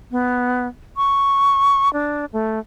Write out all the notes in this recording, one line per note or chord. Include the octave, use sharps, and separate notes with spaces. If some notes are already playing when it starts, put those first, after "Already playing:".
B3
C#6
D4
A3